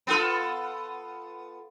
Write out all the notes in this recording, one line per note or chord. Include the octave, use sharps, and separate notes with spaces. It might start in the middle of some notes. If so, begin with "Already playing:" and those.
B3 F4 A4